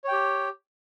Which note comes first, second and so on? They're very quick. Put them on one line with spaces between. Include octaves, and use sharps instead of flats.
C#5 G5 G4